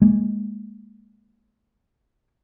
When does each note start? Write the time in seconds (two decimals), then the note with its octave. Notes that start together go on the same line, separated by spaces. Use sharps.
0.02 G#3 A#3